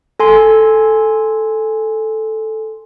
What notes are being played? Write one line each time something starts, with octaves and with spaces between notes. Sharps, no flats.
A4 G#5 C6